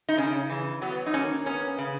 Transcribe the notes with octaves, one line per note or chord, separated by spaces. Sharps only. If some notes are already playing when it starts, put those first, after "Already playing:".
D#4
C#3 C#4
E3
F#3 B3
D#4
A#3 C#4
B3 C#4
C#3